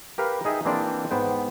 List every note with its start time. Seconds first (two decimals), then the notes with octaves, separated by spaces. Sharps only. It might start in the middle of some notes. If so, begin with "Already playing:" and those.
0.18 G4 A#4 B4 F5
0.45 D#4 G#4 D#5 E5 G5
0.65 E3 A#3 C4 D4 C5 D5
1.11 G#2 B3 C5 G5